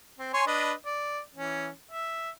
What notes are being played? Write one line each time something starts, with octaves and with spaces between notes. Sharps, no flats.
C4
C#5 G#5 C6
D4 B4 D#5
D5
E3 C#4
E5